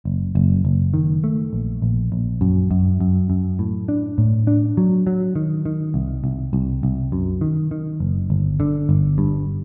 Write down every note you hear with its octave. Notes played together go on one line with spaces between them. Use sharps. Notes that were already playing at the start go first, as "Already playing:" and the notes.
F#1
F#1
F#1
D#3
A3
A#1
A#1
A#1
F#2
F#2
F#2
F#2
A2
D4
A2
D4
F#3
F#3
D#3
D#3
C2
C2
C2
C2
F#2
D#3
D#3
F#1
G1
D3
G1
G2